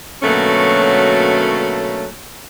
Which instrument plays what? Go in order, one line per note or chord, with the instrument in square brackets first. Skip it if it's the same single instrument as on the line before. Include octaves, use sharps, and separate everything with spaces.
[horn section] B2 D3 F#3 A3 A#3 C#4